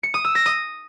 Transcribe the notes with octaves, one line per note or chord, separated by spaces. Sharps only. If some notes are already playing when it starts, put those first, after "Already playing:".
C#7
D#6
E6
A#6
D#6